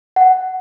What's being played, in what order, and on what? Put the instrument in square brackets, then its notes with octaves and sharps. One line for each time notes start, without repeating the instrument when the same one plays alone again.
[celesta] F#5